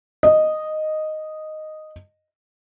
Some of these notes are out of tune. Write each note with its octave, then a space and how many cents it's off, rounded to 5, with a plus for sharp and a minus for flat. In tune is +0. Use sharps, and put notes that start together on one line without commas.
D#5 -5